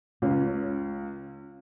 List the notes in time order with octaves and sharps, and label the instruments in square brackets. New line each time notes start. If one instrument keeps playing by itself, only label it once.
[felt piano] C#2 [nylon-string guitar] C#4